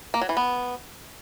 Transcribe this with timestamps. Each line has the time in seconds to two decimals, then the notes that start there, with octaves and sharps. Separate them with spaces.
0.14 A#3
0.21 F#3
0.29 E3
0.37 B3